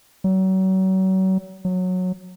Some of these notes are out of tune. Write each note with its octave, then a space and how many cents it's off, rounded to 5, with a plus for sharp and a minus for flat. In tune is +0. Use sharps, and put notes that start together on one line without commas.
F#3 +35
F#3 -15